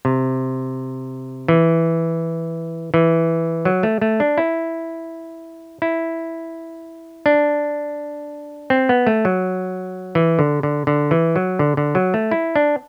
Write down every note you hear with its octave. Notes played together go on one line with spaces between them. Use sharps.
C3
E3
E3
F#3
A3
A3
D4
E4
E4
D4
C4
B3
A3
F#3
E3
D3
D3
D3
E3
F#3
D3
D3
F#3
A3
E4
D4